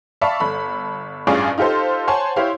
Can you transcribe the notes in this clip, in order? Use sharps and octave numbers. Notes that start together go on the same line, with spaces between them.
D5 E5 F5 A5 B5 C#6
G1 A4 B5
A1 G2 C#4 F4 G#4 D5
D#4 F4 G4 A4 C5
C5 C#5 F#5 G#5 A5 C6
E4 G4 C5 C#5 F5